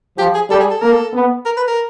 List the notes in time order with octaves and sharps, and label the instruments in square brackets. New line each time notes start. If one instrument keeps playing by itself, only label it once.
[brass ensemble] F3 [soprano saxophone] G4
[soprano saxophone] G#4
[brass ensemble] G3 [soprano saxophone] A4
[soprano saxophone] G#4
A4
[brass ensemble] A#3 [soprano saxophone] A#4
[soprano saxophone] A4
[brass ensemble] B3
[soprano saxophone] A#4
B4
A#4